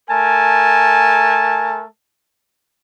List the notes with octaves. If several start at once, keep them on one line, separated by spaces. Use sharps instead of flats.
A3 A#4 G#5 A5